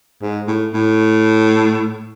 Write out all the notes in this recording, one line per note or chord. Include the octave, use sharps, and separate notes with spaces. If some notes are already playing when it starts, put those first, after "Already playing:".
G#2
A2
A2